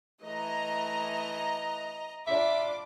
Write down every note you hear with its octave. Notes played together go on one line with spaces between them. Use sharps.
E3 A3 D#5 A#5
D4 F4 E5 B5 D6